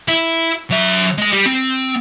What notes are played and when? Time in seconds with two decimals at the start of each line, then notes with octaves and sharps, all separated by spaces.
0.08 E4
0.71 F#3 E5
1.18 G#3 G#5
1.33 G3
1.46 C4